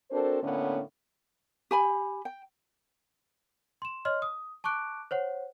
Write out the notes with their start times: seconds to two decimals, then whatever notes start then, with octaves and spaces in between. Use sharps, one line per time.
0.11 C4 D4 F#4 A4 A#4 C5
0.43 A2 D3 A#3 B3 C#4
1.71 G4 G#5 B5
2.25 G5
3.82 C6 E7
4.05 C#5 D#5 C6 F6
4.22 D#6
4.64 A5 C#6 D6 F#6 D7
5.11 C5 C#5 F#5